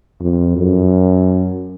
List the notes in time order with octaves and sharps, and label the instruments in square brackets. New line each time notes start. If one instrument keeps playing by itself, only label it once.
[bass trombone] F2
F#2